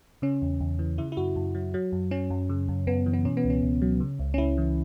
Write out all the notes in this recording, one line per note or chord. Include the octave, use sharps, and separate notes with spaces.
C#3 C#4
E2
E2
E3
C#3 E4
E4
F#2 F#4
F#2
F#3
F#3
F#2
F#3 C#4
F#2
C#3
F#2
F#2 B3
E3
B3
B2 C#4
B3
C#2
C#4
C#2
F#3
C#3
C#2
C#4
C#2 E4
E3